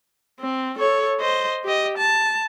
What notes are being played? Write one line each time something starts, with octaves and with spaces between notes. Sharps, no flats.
C4
A4 C#5
C5 D#5
G4 D#5
A5